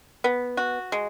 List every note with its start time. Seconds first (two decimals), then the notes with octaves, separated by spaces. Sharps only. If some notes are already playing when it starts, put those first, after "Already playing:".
0.24 B3
0.57 F#4
0.92 G#3